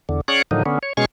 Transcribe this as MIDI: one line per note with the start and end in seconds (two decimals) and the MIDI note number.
0.09 0.21 40
0.09 0.21 50
0.28 0.42 61
0.28 0.42 68
0.28 0.42 73
0.28 0.42 74
0.28 0.42 78
0.51 0.63 45
0.51 0.63 50
0.51 0.63 51
0.51 0.63 53
0.51 0.63 54
0.51 0.63 63
0.66 0.79 50
0.66 0.79 59
0.66 0.79 61
0.83 0.93 73
0.97 1.05 47
0.97 1.05 56
0.97 1.05 61
0.97 1.05 68
0.97 1.05 85
0.97 1.05 89